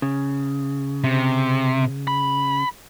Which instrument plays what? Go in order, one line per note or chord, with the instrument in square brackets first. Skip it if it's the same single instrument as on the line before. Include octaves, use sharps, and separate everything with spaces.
[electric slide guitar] C#3
[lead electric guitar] C3
B5